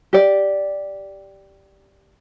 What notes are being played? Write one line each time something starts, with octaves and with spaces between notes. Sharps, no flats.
G4 D5